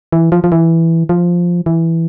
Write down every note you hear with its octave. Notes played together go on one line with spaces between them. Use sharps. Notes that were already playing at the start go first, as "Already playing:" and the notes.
E3
F3
F3
E3
F3
E3